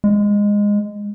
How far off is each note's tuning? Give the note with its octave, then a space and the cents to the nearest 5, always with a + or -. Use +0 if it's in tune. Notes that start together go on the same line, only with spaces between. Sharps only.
G#3 -15